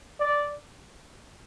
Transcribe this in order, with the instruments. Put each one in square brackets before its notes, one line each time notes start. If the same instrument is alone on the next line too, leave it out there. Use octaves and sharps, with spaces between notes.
[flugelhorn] D5